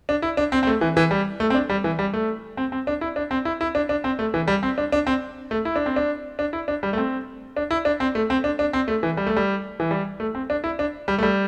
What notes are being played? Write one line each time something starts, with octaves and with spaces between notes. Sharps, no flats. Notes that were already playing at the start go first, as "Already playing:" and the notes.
D4
E4
D4
C4
C4
A3
E3
E3
G3
A3
C4
D4
G3
E3
G3
A3
C4
C4
D4
E4
D4
C4
E4
E4
D4
D4
C4
A3
E3
G3
C4
D4
D4
C4
A3
E4
D4
C4
D4
D4
E4
D4
G3
A3
C4
D4
E4
D4
C4
A3
C4
D4
D4
C4
A3
E3
G3
A3
G3
E3
G3
A3
C4
D4
E4
D4
G3
A3
G3